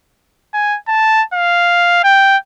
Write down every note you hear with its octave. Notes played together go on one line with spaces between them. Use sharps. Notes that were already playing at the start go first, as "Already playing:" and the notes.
G#5
A5
F5
G5